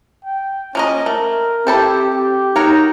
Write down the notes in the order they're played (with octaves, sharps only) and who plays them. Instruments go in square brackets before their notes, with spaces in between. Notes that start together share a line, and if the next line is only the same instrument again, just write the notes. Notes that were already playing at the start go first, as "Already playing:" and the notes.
[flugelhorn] G5
[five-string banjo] F3 A#3 D#5 [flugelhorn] C#4
[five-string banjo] A3 [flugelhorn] A#4
[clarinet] C4 [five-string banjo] E4 A4 C5 [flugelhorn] G4
[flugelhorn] G4
[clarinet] D#4 [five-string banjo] F#4 A#4 C#5